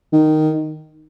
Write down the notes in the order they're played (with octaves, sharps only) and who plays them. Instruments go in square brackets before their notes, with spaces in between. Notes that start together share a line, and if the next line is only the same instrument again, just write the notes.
[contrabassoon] D#3